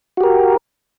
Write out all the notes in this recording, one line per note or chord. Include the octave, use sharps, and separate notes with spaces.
F#4 G4 A#4